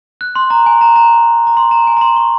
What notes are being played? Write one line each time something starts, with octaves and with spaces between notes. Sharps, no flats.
F#6
C6
A#5
G#5
A#5
A#5
A#5
C6
A#5
G#5
A#5
C6
C#6